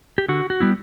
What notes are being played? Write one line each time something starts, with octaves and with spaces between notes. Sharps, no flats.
G4
D3 F#4
F#4
G3 B3 E4